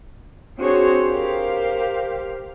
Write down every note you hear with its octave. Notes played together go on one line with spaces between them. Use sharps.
C4 D4 F#4 G#4 C5 C#5
G4 A#4 C5 F5